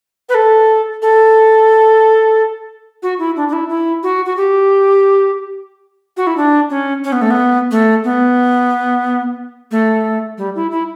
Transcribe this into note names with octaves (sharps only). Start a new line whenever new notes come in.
B4
A4
A4
F#4
E4
D4
D4
E4
E4
F#4
F#4
G4
F#4
E4
D4
C#4
C#4
B3
A3
B3
A3
B3
A3
G3
E4
E4